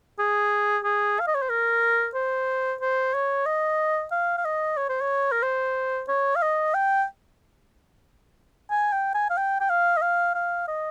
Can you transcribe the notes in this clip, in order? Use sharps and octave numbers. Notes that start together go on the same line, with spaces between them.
G#4
G#4
F5
D#5
C#5
C5
A#4
C5
C5
C#5
D#5
F5
F5
D#5
C#5
C5
C#5
A#4
C5
C#5
F5
D#5
G5
G#5
G5
G#5
F5
G5
G5
F5
D#5
F5
F5
D#5